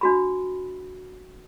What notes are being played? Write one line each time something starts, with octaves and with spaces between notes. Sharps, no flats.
D4 F#4 B5